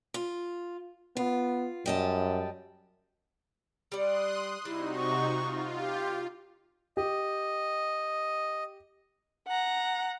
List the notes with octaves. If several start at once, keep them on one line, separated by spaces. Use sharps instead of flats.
F4
B3 F4
F#2 G3 D#5 A5
G3 D5 C6 D#6 F#6
C3 G3 D#4 E4 F#4
C#6
F4
G4
G4 D#5
F#5 A#5